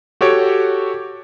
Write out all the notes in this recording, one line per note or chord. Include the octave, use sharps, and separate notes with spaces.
F#4 G4 A4 C#5 D7